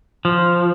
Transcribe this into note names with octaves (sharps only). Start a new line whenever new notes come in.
F3